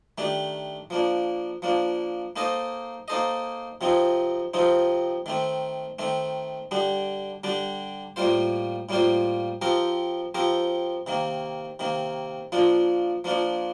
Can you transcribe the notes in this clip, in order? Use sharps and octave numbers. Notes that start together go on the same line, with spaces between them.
D#3 A3 D4 G4
F3 A#3 D4
F3 A#3 D4
A#3 D#4 A4 C5 D#5
A#3 D#4 A4 C5 D#5
C3 F3 C4 D#4
C3 F3 C4 D#4
D#3 A3 C4
D#3 A3 C4
D3 G3 D4 G4
D3 G3 D4 G4
A2 G3 A#3 F4 C5
A2 G3 A#3 F4 C5
F3 C4 G4 A#4
F3 C4 G4 A#4
C3 D#3 A#3
C3 D#3 A#3
F3 A#3 D4 F4
F3 A#3 D4 F4